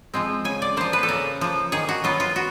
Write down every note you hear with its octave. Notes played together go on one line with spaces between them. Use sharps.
F3 G#3 C4
C#3 G#5
D5
F3 A#3 C5
B4
A4
C#3 A#4
F3 A#3
D#3 G#4
F#4
F#3 B3 F4
F4
F#4